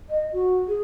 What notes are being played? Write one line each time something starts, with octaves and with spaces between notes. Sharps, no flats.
D#5
F#4
G#4